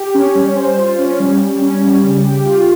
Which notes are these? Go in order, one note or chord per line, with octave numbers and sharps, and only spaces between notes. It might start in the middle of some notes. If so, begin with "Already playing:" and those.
Already playing: G4
C#4
G3
C5
F4
C#4
G3
G3
C#4
G3
C#3
G4
F4